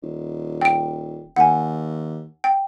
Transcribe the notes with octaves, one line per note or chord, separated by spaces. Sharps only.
D#1
G5 D7
D#2 F#5 G#5
G5